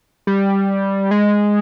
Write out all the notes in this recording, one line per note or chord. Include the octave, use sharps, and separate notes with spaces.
G3
G#3